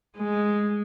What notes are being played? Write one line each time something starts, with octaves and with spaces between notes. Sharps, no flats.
G#3